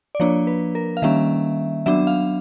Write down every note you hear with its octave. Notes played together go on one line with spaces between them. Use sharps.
D5
F3 A#3 D4 C#5
B4
A#4
F5
D#3 G3 A#3 C#4 E5
F#3 B3 D4 E5
F5